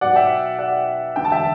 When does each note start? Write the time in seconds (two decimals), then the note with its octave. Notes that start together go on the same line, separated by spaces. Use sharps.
0.01 B1 B2 F#3 D5 F#5
0.16 E5 G5
0.59 D5 F#5
1.16 E1 D2 D3 G5
1.25 A5
1.32 E5 G5